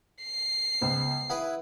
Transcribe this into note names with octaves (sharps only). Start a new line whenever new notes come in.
C7
C#2 B3 C5
E4 G#4 B4 F#5